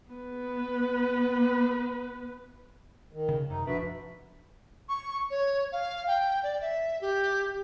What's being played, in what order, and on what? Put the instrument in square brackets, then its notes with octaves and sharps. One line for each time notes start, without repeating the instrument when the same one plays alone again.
[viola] B3 B4
[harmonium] D#3
[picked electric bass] C#3
[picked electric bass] F#2 C3 [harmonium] D#4
[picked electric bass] D1 F3 D4 [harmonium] F#4 B4 E5
[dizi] C#6
C#5
F5
G5
D5
E5
G4